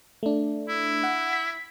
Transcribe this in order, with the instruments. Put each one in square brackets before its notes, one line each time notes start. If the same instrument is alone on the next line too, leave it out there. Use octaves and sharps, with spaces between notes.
[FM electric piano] A3 D4
[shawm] E4
[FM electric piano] F#5
B6